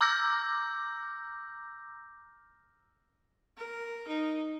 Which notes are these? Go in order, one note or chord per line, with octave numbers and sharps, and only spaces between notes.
A#5 D6 E6 F6 G6 A#6
A#4
D#4